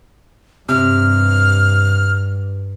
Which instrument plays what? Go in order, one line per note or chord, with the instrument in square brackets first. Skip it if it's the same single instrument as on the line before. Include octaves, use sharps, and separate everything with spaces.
[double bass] G2 [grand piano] C3 [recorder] F6